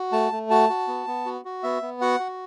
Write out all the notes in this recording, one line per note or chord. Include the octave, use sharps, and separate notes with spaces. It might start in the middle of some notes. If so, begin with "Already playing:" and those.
Already playing: F#4
A3 A5
A3
F#4 A5
F#4
B3
B3
F#4
F#4
B3 E5
B3
F#4 F#5
F#4